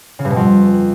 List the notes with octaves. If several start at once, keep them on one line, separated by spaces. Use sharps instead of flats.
C#3
G2
B2
F2